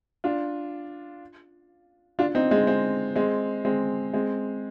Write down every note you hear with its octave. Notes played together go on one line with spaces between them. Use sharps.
D4 F4
D4 F4
C4 D#4
G#3 C4
G#3 C4
G#3 C4
G#3 C4
G#3 C4